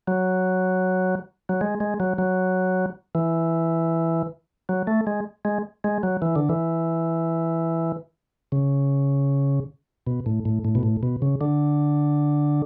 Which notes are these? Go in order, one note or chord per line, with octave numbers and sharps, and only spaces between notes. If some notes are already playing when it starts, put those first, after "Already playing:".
F#3
F#3
G#3
G#3
F#3
F#3
E3
F#3
A3
G#3
G#3
G#3
F#3
E3
D3
E3
C#3
B2
A2
A2
A2
B2
A2
B2
C#3
D3